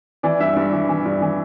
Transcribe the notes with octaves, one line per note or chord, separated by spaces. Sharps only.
E3 D5
G2 E5
G2 D5
E3
E3
G2
E3